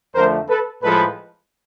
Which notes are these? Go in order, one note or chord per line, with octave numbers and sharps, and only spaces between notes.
F2 D3 F3 A3 A#4 C5
A4 B4
A2 F3 G#3 A4 B4